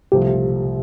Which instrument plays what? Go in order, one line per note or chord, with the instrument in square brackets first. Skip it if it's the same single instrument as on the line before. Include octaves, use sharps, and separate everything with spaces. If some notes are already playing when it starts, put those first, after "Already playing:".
[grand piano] C2 C3 F3 A3 [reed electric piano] G4